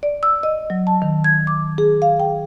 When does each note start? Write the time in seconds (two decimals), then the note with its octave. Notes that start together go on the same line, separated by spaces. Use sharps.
0.03 D5
0.23 E6
0.43 D#5
0.70 F#3
0.87 A5
1.02 D#3
1.24 G#6
1.47 D6
1.78 G#4
2.02 F5
2.20 G5